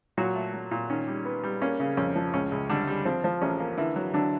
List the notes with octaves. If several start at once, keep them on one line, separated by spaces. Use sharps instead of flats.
A#2 F#3 F#4
A3
F#3
A#2
D#3 C#4
G3
B3
G3
A#3 C#4
C#3
F2 C#4
F3
C#2 C#4
C#2
D3 G3 D4
G3
F3 C4
F3
A1 C#4
A#3
D3 E3 E4
F#3
D3 F#3 D4